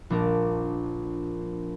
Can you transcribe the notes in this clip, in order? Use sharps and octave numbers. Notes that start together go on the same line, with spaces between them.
A#1 D4 A#4